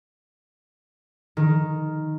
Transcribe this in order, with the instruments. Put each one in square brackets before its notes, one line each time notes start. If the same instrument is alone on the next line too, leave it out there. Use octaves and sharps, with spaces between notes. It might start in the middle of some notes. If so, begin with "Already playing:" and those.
[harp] D#3